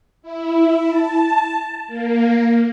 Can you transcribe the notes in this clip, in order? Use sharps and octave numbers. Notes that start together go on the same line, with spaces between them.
E4
A5
A#3